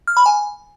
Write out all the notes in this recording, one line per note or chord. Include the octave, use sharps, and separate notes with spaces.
F6
B5
G#5